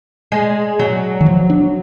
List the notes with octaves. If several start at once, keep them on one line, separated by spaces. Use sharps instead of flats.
G#3
F#3
D#3
F3
D4